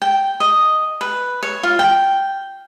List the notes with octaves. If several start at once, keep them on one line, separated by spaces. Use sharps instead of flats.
G5
D#5
B4
C#5
F4
G5